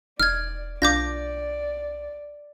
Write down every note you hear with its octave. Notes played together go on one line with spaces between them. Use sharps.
E1 D#4 D5 F6 G#6
B1 D4 F4 D5 D6 G6 A#6